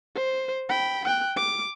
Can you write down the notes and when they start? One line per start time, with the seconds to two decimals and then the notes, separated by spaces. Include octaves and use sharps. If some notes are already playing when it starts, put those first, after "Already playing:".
0.15 C5
0.69 G5 B5
1.05 G5 F#6
1.36 D6